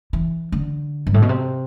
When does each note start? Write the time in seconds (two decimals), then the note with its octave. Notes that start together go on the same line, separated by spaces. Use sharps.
0.13 E3
0.52 D3
1.07 G2
1.14 A2
1.22 B2
1.29 C3